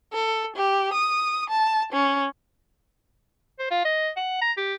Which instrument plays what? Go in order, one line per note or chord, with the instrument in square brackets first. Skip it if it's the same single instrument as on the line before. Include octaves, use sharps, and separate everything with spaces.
[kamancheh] A4
G4
D#6
A5
C#4
[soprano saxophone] C5
F4
D#5
F#5
A#5
G4